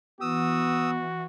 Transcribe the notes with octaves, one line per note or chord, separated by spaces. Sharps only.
E3 B3 F#4 D#6 E6